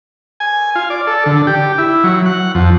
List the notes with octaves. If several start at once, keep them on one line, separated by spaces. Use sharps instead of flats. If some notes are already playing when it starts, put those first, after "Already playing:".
G#5
F4
D5
A4
D3
G4
E4
F#3
F#5
F2